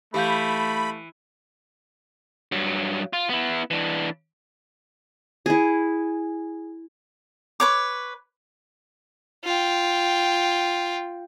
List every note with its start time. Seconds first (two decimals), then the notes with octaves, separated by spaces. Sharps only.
0.14 E3 A3 G4 F5 B5 G6
2.52 G2 F#3
3.13 F4
3.29 B3 E4
3.71 E3 D4
5.46 E4 G#4
7.60 B4 C#5 D6
9.45 F4 G5